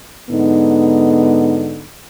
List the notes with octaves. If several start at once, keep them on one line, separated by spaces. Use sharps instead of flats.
G#2 D3 B3 D#4